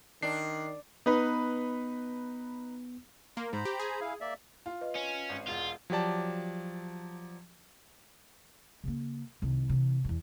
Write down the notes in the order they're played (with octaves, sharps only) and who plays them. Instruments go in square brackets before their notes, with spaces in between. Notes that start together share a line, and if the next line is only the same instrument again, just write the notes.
[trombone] D#3 [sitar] D4 [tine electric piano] C7
[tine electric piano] B3 [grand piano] D#4 B4
[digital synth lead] A#3 [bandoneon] C6
[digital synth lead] G#2 [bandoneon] C5 A#5 B5
[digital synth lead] G4
G#4
[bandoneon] E4 F5
A#3 D5 E5
[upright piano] F4
[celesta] B4 D#5
[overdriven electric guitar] C#4
[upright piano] G#1
[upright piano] E1 [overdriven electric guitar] F4
[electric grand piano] F3 F#3 G4 D5 A5
[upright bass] C#3 A#3
C2 D#3
C3 E3
E2 E3